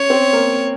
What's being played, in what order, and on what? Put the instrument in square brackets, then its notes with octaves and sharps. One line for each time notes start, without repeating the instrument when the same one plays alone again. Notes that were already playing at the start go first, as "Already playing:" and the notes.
Already playing: [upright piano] C#4 [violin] C#5
[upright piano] C4
A#3